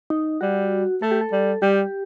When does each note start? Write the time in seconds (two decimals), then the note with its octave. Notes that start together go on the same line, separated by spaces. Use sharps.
0.10 D#4
0.41 G3 F#4
1.01 A3 A4
1.11 G4
1.21 A4
1.32 G3
1.62 G3 G4